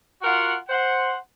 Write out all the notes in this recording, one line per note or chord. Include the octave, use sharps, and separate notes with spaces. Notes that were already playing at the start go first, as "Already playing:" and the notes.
F4 F#4 A#4 F#5
C5 F#5